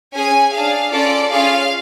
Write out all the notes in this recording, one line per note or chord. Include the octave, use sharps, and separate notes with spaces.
C#4 G#4 G#5
D4 G#4 F5
C#4 F4 A4 D5
C#4 F4 G#4 F5